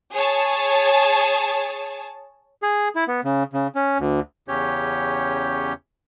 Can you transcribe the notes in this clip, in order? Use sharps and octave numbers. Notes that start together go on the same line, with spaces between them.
G#4 C#5 A5
G#4
E4
B3
C#3
C#3
C#4
D2
E2 C#3 C#4 G4 C#5 G6